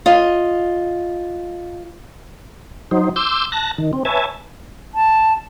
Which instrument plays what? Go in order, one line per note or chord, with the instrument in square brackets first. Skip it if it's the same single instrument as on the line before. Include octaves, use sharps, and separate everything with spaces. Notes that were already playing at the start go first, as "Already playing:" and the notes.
[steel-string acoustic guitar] F4 D#5
[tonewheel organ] F#3 D#4 C5
C6 D6 E6 G6
A5 F#6 A#6
D#3
C4
B4 C#5 E5 G#5 A5
[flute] A5